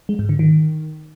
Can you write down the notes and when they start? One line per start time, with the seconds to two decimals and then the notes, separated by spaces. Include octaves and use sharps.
0.09 G#3
0.19 G#2
0.29 D3
0.39 D#3